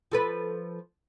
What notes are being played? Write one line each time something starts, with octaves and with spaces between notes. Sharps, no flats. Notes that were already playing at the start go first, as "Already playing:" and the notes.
F3 A4 B4